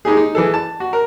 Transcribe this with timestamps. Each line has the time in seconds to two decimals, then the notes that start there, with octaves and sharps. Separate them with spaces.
0.05 G#3 D#4 G4 G#4
0.17 D#4
0.35 E3 G#4 A4
0.54 A5
0.80 F#4
0.93 A#4